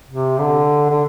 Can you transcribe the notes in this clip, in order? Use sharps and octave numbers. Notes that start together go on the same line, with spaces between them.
C3
D3
D3